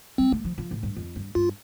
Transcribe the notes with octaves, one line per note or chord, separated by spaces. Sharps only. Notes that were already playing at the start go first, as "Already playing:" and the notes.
G3 C4
A3
F3
F3
A2
G2
F2
G2
G2 F4